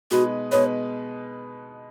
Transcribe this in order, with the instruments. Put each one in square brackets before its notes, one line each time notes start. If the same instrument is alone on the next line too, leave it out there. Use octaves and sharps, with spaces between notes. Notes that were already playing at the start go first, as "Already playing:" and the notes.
[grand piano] B2 G#3 D#4 B4 [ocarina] F#4
[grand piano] B2 G#3 D#4 B4 [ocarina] C#5